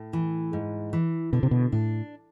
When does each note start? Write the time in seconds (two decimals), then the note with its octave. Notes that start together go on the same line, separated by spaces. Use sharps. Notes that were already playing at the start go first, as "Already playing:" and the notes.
Already playing: A2
0.13 E3
0.53 G#2
0.93 E3
1.33 B2 D3
1.43 C3
1.51 B2
1.72 A2 D4